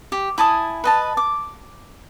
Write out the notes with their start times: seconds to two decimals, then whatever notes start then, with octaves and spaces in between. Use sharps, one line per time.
0.12 G4
0.38 E4 G#5 A5 D#6
0.84 B4 D#5 A5
1.17 D6